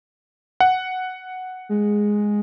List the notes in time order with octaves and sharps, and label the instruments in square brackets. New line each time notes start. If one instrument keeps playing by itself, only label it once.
[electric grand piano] F#5
[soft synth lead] G#3